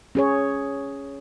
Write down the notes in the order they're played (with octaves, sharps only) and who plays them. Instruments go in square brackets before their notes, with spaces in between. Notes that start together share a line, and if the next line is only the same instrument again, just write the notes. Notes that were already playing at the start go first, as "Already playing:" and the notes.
[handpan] C#4 G#4 C#5